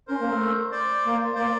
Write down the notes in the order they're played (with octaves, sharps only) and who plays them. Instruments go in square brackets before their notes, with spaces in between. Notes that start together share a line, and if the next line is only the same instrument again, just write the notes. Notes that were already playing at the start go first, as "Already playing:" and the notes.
[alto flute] C#4 [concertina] A#4 C5
[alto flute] A#3
A3
[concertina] C5 D5
[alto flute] A#3
[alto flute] A#3 [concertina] C5 D5